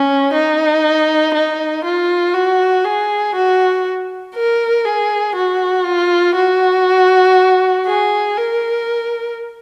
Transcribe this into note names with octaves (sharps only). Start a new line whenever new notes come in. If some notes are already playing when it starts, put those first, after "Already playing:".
Already playing: C#4
D#4
D#4
F4
F#4
G#4
F#4
A#4
G#4
F#4
F4
F#4
G#4
A#4